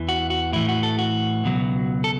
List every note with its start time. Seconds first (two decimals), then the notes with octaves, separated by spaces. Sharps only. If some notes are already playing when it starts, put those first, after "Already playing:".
Already playing: E2 E3
0.09 F#4
0.30 F#4
0.53 A2 E3 E4
0.69 F#4
0.83 A4
0.99 F#4
1.44 C#2 B2 F#3
2.04 A4